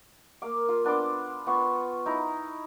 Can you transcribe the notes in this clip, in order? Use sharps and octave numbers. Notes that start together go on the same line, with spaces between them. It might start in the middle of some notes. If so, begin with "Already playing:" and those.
A#3 F5 D6
F4
B3 D4 C6 D6
B3 F4 B5 C#6
D#4 E4 A#5